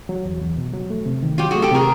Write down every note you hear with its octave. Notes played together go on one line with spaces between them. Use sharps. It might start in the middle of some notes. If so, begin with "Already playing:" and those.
F#3
E2
E2
B2
F#3
A3
C3
D#3
F#3 F4 G4
A3 F#4 G#4
G4 A4
C3 G#4 A#4